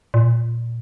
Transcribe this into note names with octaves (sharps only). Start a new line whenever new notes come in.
A#2